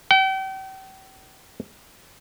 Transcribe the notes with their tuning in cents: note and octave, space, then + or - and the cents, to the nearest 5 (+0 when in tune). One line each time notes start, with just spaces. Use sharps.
G5 -40